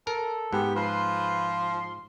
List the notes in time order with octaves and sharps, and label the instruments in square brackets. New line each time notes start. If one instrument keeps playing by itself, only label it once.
[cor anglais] A4 [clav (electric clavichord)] A#4
[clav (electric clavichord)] G#2 [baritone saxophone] B3 [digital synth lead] G4
[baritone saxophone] F3 [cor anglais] B4 [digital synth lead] C6